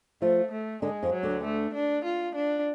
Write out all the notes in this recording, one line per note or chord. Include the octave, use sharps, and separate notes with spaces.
F3 A3 F4
A3
D3 G#3 D4
F2 F3
F#3
D2 D3
A3
D4
F4
D4